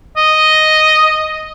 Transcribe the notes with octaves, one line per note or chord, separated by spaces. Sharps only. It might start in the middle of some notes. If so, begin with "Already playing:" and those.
D#5